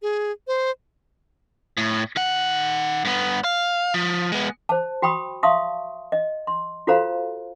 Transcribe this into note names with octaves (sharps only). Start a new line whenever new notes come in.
G#4
C5
A2
D#3 F#5
G2 B3
F5
F3
G#3 B3
C5 A5
F#4 G5 B5 C#6 D#6
E5 F5 A5 C6 C#6 D#6
D#5
C6
F4 F#4 A4 C5 F5 A#5